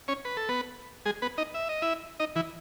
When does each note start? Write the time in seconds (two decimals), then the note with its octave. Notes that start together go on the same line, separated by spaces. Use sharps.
0.08 C#4 C#5
0.25 B4
0.37 A4
0.49 B3 B4
1.06 G#3 G#4
1.22 B3 B4
1.38 D#4 D#5
1.54 E5
1.69 D#5
1.82 E4 E5
2.20 D#4 D#5
2.36 E3 E4